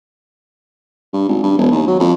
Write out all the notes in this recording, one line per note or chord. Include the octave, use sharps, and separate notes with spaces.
G2
G#1
G2
E1
D#2
F#3
F2